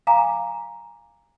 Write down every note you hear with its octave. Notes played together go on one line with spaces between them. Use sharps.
F5 G#5 A#5 D6